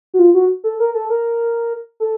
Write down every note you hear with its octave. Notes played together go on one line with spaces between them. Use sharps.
F#4
F4
F#4
A4
A#4
A4
A#4
A4